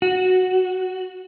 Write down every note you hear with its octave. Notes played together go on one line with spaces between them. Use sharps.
F#4